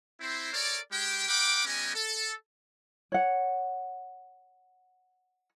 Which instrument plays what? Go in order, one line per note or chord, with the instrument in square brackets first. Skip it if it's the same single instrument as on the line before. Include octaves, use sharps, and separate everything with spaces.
[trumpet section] C4 E4 C5
A4 A#4 C#5 D5
G#3 G4 G5
A#4 F#5 G5 B5 D6
G3 B3 C#4 G4 D#5 G#5
A4
[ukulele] C#5 F#5